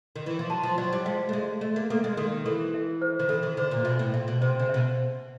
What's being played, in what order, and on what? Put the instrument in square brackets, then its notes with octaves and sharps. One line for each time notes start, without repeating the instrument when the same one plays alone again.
[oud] D#3
E3
F3
[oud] F#3 [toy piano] A5
[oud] F3
[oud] F#3 [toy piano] D5
[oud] G3
[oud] G#3 [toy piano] F5
[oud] A3
[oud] G#3 [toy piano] D5
[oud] A3 [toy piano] D5
[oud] A#3
[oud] A#3 [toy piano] A4
[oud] G#3
[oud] D#3 [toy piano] A4
[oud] E3 [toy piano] A4
[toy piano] E5
C5
[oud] D#3
[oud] E3 [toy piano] A4
[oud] D#3
[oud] D3 [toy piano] C5
[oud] A#2
[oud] B2 [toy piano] E5
[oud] A2
[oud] A#2 [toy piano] E5
[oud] B2
[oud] C3 [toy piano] C5
[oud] C#3
[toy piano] E5
[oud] B2